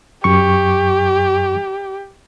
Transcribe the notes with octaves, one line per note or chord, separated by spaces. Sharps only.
F#2 G4 C#6